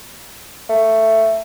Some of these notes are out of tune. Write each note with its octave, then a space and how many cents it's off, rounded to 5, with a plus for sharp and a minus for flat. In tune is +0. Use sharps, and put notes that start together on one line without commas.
A3 +10